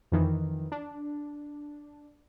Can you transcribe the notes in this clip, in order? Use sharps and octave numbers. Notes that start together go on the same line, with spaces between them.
F2 D#3 E3
D4